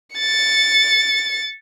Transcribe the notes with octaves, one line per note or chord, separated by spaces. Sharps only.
A6 C#7